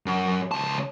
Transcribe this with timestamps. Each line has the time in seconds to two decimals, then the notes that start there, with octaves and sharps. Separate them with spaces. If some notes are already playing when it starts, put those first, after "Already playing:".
0.06 F#2
0.51 C#2 A5